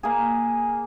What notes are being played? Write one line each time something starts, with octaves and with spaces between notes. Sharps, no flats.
A#3 G#4